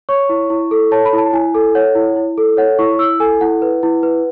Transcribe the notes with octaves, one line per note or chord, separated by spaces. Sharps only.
C#5 C#6
E4
E4
A4
C#5 A5
B5
E4
A5
E4 G#5
A4
C#5 F#5
E4
E4
A4
C#5 F#5
E4 C#6
E4 E6
A4 G#5
E4 F#5
B4
E4
B4